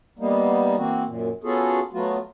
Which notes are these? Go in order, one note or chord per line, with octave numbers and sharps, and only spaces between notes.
G3 A#3 B3 D#4
E3 A#3 C4 F#4
F#2 A#2
B3 C#4 F4 F#4 G#4 A4
F#3 A3 B3 F4 F#4